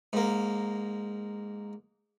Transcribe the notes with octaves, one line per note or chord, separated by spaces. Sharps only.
G#2 A#3